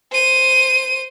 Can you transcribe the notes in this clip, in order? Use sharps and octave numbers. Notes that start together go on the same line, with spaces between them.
C5 D#7